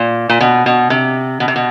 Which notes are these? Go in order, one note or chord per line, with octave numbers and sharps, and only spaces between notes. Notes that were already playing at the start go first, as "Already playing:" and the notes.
Already playing: A#2
A#2
B2
B2
C3
B2
C3
B2